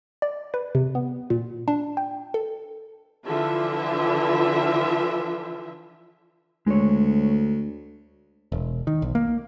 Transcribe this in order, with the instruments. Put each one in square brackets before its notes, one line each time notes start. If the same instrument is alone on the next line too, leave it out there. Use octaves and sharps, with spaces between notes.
[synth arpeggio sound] D5
B4
C3
B3
A#2
D4
G5
A4
[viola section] D3 E3 F3 F4 E5
[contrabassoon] D2 [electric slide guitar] G#3 C#5
[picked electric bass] E1
D#3
B1
A#3